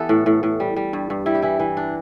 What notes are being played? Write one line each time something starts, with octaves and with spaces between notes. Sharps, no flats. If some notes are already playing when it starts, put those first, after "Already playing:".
Already playing: E3 B3 E4 G4 A4
A2
A2
A2
G3
G3
G2
G2
G3 E4
G4
E3 E4
E3
D4